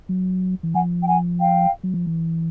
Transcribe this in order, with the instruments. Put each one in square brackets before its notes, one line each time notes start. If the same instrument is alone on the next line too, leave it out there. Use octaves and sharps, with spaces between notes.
[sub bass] F#3
E3
[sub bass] F3 [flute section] F#5 G#5
[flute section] G5
F#5 G#5
F5 G5
[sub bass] F#3
F3
E3